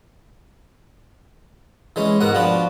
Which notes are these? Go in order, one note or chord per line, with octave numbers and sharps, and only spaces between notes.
E3 G#3 C#4
G#2 B2 A#4 F#5
F3 B3 D4 F4 F#4